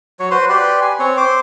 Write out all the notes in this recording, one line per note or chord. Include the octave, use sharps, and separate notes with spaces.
F#3 C#5
F#4 B4 C5 C6
G4 B4 D5 C6
G#5
C4 C#5
C5 C6 D6